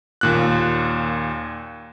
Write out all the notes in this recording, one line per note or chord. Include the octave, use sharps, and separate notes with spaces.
D#2 A#2 F#6